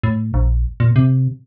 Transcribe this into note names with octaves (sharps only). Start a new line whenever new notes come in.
A2
A#1
A#2
C3